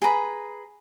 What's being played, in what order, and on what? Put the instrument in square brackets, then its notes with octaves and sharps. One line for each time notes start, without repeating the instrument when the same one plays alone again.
[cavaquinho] G#4 B4 A#5 B5